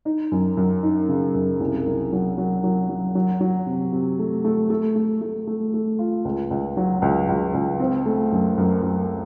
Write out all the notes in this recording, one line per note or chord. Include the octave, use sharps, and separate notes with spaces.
D#4
F#2
F#2
D#4
C#3
F#2
C2
C2
F#3
F#3
F#3
F#3
F#3
F#3
C3
C3
A3
A3
A3
A3
A3
A3
A3
F4
C#2
C#2
F#3
C#2
C#2
C#2
C4
A3
F#2
F#2
F#2